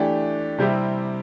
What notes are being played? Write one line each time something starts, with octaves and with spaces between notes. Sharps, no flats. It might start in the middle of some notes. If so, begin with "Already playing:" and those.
Already playing: E3 A3 D4 G4
C3 G3 C4 E4 G4